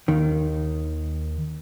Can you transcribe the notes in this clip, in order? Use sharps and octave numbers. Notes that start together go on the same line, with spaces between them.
D#2 D#3